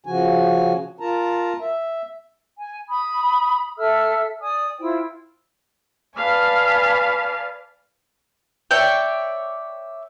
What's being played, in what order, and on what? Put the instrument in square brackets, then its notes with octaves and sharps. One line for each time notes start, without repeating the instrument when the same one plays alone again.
[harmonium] C#3 F3 F#4 G#5
F4 A#4 A5 A#5
E5
[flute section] G#5
B5 D#6
A4 E5 E6 F6
D5 G#5 D#6
E4 F4 C5 G5
[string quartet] B4 D5 F5 G#5 A5
[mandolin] C#5 D5 E5 G5